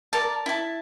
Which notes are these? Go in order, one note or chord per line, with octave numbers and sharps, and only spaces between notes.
A#4 D5 A5
E4 A5